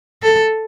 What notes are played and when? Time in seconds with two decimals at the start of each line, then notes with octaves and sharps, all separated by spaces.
0.22 A4